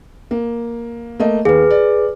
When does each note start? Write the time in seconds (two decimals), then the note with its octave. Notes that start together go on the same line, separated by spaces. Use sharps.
0.31 A#3
1.19 A3 A#3 D#5
1.45 D#2 G#4 B4
1.70 D5